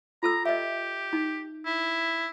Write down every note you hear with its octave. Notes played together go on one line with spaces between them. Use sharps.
F4 A4 A#5 E6
G4 D#5 E5
D#4
E4